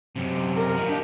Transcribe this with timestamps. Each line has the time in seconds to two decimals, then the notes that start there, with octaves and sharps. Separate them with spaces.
0.16 F#2 C3
0.57 A#4
0.76 A#2 D#3
0.89 D4 D#4 G4